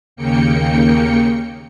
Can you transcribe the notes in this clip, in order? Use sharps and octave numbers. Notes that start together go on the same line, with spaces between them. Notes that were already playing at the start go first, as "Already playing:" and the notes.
D#2 C#3 A#3 G5 C#7